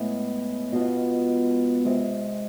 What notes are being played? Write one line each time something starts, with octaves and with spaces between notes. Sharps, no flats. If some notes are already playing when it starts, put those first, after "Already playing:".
Already playing: A2 G#3 B3
B2 B3 F4
C3 G#3 C4